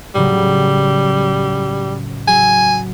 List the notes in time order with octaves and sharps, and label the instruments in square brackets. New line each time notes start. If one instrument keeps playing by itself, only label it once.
[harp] A2 C#3 F#3 [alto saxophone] G3
[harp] F#3 [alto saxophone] G#5